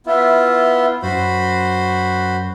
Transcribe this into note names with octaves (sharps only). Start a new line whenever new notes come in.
B3 E4 F4 E5
F#2 F#4 C5 B5